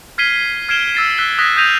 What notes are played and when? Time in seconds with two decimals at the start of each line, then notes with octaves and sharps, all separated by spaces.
0.18 F6 G#6 B6 C7 D#7 G7
0.69 F6 G#6 C7 D7 E7 G7
0.95 E6 A6 C7
1.18 E6 F#6 B6 G7
1.38 D#6 F#6 G#6 A#6 B6
1.56 D#6 E6 G6 A#6 D#7 F7